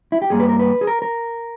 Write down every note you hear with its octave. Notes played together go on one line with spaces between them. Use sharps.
E4
G4
G2 G3 A#3 G#4
B4
A#4
B4
G#4
A#4
A#4